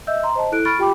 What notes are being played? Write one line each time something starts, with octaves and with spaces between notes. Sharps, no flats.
D#5 E5 E6 G6
A#5 C6
C5 D#5 A5
E4 A4 F#6 D7
B5 C#6 F6 A6 D7
F4 G4 G5 B5 D6